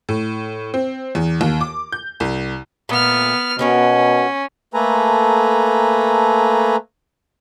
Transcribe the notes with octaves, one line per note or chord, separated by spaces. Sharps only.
A2
C4
E2
D#2
D6
G6
C2
A#2 A3 B3 F6
B2 B3 C#4 F#4 A#4
A3 A#3 A4 B4 G#5 A#5